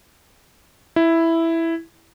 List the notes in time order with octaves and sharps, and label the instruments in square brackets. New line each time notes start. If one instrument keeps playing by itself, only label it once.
[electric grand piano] E4